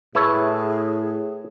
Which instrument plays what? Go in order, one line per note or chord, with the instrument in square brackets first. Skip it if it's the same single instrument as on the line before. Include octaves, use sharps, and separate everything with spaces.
[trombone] A2 [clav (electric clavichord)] E4 A4 C#5 [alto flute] G#4 [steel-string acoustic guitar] B4 A5